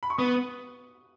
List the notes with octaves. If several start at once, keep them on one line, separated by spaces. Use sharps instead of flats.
B5
C#6
B3 D#6